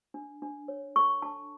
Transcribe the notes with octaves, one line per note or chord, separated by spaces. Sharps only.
D4
D4
C#5
A4 C#6
D4 A5